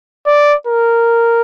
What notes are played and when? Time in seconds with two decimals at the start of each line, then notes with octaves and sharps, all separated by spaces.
0.27 D5
0.67 A#4